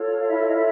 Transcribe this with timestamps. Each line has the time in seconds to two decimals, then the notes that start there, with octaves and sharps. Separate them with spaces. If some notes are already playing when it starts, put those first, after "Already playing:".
Already playing: F4 A4 C#5
0.20 F5
0.28 E4 E5
0.46 D#5
0.55 E4 E5